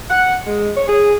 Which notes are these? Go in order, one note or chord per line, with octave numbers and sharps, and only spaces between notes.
F#5
G#3
C#5
G#4